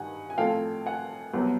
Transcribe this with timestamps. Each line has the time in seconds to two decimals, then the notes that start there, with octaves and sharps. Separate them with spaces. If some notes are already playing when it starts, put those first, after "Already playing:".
Already playing: G2 D#3 F#5 G#5
0.30 G#5
0.38 A2 F3 A3 C4 F5 G5
0.86 F#5 G#5
1.34 C2 B2 F#3 B3